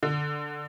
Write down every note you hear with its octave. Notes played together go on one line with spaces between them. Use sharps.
D3